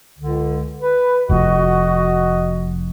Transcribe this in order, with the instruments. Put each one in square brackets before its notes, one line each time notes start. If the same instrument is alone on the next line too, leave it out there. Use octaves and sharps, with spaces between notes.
[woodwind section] C#2 D3
B4
[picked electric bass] F1 F2 [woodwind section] F#4 D#5